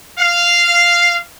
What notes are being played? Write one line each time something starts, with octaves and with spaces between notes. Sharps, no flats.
F5